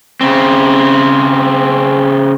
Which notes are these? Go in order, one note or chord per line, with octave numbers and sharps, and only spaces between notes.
C#3 C4